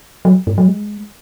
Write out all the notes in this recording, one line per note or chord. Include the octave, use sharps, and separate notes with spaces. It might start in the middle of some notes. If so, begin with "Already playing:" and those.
F#3
G#2
F#3
G#3